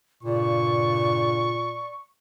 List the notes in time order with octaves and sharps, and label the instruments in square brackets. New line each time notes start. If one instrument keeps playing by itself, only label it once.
[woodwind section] G2 C#3 [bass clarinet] A#2 [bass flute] D5 [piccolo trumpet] C#6